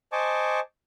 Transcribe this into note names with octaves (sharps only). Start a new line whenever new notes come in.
C5 D#5 G#5 A5 C#6 D6